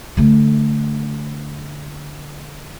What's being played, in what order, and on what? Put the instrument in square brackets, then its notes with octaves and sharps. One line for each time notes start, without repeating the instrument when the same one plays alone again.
[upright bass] D3 A3